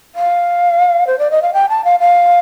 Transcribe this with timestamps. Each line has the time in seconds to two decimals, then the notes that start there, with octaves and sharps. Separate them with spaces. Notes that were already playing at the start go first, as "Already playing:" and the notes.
0.15 F5
1.07 C5
1.19 D5
1.31 D#5
1.42 F5
1.54 G5
1.69 A5
1.84 F5
2.00 F5